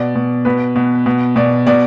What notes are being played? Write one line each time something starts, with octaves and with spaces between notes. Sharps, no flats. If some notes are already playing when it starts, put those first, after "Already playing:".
Already playing: B2 D5
B2
B2 B4
B2
B2
B2 D5
B2 D5